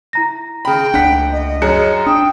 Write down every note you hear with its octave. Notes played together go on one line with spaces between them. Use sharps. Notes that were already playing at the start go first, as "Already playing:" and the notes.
E4 A#5 A#6
C#3 G5 B5
C#2 D4 F#5 B6
D#5
F#2 G#4 C#5 F#6 C#7
D4 G5 D#6